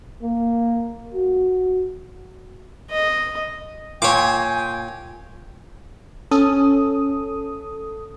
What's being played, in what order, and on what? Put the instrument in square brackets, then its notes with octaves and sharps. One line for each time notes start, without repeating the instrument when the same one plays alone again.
[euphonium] A#3
F#4
[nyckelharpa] D#5
[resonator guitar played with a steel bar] A#2 [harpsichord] C#5 D6 [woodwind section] G5 G#5
[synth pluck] C#4 [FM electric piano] A4 D#6